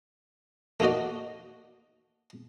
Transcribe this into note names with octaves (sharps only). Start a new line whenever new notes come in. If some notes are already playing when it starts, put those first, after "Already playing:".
A3 A#3 D#4 F#4 D5